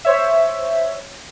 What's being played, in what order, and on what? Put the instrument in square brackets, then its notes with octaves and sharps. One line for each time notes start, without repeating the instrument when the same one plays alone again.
[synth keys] C5 C#5 E5